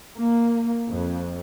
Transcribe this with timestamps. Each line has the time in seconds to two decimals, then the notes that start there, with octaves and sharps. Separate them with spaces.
0.17 A#3
0.88 F2